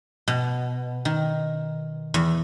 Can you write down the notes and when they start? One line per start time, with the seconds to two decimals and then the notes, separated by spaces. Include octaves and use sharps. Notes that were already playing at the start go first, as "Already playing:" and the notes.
0.28 B2
1.05 D#3
2.14 E2